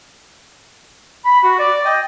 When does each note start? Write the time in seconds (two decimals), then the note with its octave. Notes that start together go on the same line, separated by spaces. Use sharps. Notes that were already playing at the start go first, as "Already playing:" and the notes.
1.25 B5
1.43 F#4
1.59 D5
1.85 D#5 G5